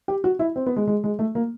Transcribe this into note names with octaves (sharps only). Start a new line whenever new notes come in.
G4
F#4
E4
C4
B3
G#3
G#3
G#3
A3
A#3